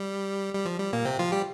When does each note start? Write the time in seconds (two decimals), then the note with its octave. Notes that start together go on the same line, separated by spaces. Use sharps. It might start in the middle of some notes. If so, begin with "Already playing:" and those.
Already playing: G3
0.55 G3
0.65 F3
0.80 G3
0.93 A#2 A#3
1.05 C3 C4
1.19 F3 F4
1.32 G3 G4